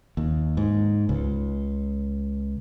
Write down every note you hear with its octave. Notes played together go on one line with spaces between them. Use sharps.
D#2
G#2
C#2